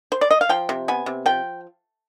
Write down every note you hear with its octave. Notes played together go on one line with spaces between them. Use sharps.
C5
D5
D#5
F5
F3 G5
C3
B3 G#5
C3
F3 G5